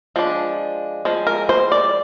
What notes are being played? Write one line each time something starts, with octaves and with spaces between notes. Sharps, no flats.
F3 G#3 D4
F3 G#3
A#4
C5
D5